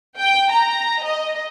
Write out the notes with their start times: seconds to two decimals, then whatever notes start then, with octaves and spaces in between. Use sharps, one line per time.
0.19 G5
0.52 A#5
1.04 D#5